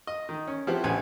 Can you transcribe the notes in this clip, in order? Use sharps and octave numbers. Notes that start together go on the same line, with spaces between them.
D#5
D#3
C#4
F3 B3 C4 E4 G4
A1 D3 B3 G#5